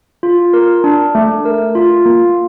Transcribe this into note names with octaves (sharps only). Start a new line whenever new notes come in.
F4
A#4
D4
A3
A#4
F4
A#3